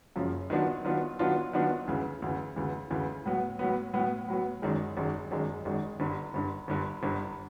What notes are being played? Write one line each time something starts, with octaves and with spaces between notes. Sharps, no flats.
F#1 F#2 C#3 F3
D#3 F#3 B3 D4 F4
D#3 F#3 B3 D4 F4
D#3 F#3 B3 D4 F4
D#3 F#3 B3 D4 F4
D2 C#3 E3
D2 C#3 E3
D2 C#3 E3
D2 C#3 E3
A2 F#3 B3
A2 F#3 B3
A2 F#3 B3
A2 F#3 B3
G#1 F#2 D#3 G#3
G#1 F#2 D#3 G#3
G#1 F#2 D#3 G#3
G#1 F#2 D#3 G#3
G1 G2 D3
G1 G2 D3
G1 G2 D3
G1 G2 D3